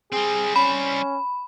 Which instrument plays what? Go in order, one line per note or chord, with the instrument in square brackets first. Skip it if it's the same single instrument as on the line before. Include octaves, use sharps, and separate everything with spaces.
[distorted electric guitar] G3 C4 [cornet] G#4
[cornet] C#4 [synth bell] B5